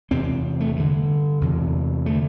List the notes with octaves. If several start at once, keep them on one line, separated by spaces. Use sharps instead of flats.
E2 C3 C4
A3
G2 D3
E2 C3
D3 A3